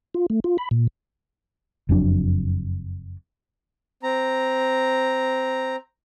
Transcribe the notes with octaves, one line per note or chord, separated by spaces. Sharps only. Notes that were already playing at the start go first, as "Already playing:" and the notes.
F4
A3
F4
B5
A#2
F#1 F2 F#3 D4
C4 A#5